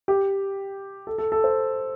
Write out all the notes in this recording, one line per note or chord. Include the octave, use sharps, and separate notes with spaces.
G4
A4
A4
A4
C5